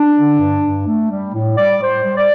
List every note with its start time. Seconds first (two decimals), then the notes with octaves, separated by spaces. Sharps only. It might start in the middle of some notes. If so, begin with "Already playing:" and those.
Already playing: D4
0.16 D3
0.39 G2
0.63 G2
0.87 A3
1.10 G3
1.34 A2
1.57 G3 D5
1.82 A2 C5
2.04 G3
2.17 D5